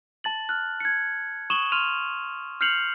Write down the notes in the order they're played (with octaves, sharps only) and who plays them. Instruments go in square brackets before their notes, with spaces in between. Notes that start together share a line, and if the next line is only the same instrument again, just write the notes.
[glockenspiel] A5 A6 F#7
F6 F#6
G#6 C#7
C#6 D#6 D#7 E7 F#7 G7
C6 F6 D#7 F7
F6 G6 C7 C#7 F7 F#7